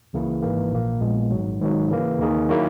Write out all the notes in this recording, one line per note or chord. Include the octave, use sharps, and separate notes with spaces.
C#2 C#3 E3 A#3 E4
G#1 G#2 E3 A#3
A#1 A#2 A#3
A#1 A#2 G#3 B3
G#1 G#2 F#3
G#1 G#2 D#3 F#3
C#3 E3 A#3
D#2 D#3 A#3 D#4 G#4
D#3 F#3 A#3 E4